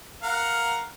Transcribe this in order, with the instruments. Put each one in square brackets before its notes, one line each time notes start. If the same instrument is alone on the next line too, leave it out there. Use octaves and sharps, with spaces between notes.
[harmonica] A#4 F5 F#5